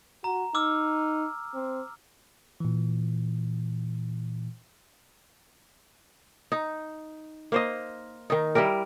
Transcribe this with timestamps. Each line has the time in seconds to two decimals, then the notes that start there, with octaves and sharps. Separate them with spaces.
0.24 F#4 A#5
0.55 D#4 D6 E6 F6
1.54 C4
2.60 A#2 E3
6.52 D#4
7.52 A#3 C5 D#5
8.30 D#3 D#4
8.55 G3 E4 G4 A#4